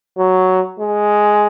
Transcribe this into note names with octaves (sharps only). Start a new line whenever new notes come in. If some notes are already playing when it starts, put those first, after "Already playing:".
F#3
G#3